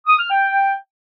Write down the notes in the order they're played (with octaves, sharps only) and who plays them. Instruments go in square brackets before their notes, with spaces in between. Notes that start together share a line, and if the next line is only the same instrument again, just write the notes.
[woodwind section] D#6
F6
G5